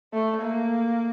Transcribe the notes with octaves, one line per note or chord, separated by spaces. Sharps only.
A3
A#3